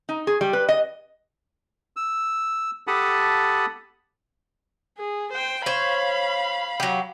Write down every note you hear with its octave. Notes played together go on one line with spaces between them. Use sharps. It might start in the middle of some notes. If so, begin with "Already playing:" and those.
D#4
G#4
G3
B4
D#5
E6
G4 A4 F#5 A5 B5 D#6
G#4
C5 G5
C5 C#5 F5 B5
F#3 G4